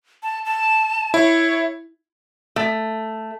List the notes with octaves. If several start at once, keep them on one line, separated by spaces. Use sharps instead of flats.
A5
A5
E4 C#5
A3